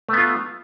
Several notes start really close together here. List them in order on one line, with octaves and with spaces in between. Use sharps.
A3 B3 F4